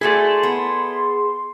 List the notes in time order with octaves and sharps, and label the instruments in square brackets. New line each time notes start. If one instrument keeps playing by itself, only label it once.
[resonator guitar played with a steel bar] A3 F#4 G#5 [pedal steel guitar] E4 A4 D5 [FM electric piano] G#4 [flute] C6
[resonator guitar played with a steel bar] B3